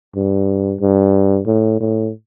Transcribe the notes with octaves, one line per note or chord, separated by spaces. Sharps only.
G2
G2
A2
A2